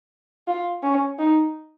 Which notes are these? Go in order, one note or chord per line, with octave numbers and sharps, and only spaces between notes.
F4
C#4
D#4